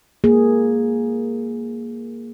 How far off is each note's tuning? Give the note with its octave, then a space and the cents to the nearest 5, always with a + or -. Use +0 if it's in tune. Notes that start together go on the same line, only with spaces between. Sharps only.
A#3 +0 G#4 +0